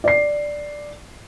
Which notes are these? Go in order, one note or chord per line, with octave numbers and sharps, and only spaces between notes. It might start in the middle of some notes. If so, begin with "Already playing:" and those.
D5 C7